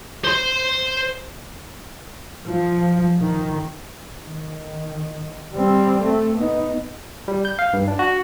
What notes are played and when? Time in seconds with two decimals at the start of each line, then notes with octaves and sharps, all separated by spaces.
0.24 C5 C6
2.45 F3
3.19 D#3
4.26 D#3
5.54 G3 C4
6.03 A3
6.37 B3 D#4
7.28 G3
7.45 G6
7.59 F5
7.73 G2
7.88 D4
7.99 F#4